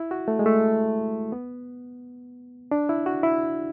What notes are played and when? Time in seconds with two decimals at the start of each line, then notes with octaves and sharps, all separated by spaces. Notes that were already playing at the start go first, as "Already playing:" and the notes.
Already playing: E4
0.11 F#4
0.28 A3
0.39 G#3
0.46 A3
1.32 B3
2.71 D4
2.89 E4
3.06 F#4
3.23 E4